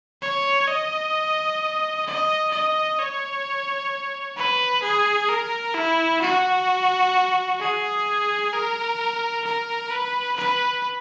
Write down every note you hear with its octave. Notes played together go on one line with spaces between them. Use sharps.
C#5
D#5
D#5
D#5
C#5
B4
G#4
A#4
E4
F#4
G#4
A#4
A#4
B4
B4